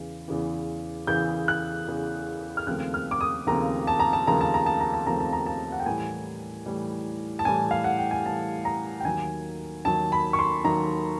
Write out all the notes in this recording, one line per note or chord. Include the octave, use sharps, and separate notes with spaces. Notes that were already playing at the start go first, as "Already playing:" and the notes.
Already playing: E2 C#3 E3
E2 C#3 E3
E2 C#3 E3 G6
F#6
E2 C#3 E3
F6
D#2 C#3 F3 A3 C4 F#6
F6
D6
D#6
D#2 C#3 F3 A3 C4 A#5
A5
A#5
A5
D#2 C#3 F3 A3 C4 A#5
A5
A#5
A5
A#5
A5
D#2 C#3 F3 A3 C4 A#5
A5
A#5
A5
F#5
G5
A2 E3 G3 G#5
A2 E3 G3
A5
A2 E3 G3 G#5
F5
F#5
G5
G#5
A2 E3 G3 A5
A#5
G5
D#2 D#3 F#3 G#5
D#2 D#3 F#3 A5
B5
C#6
C6
D#2 D#3 F#3 A#5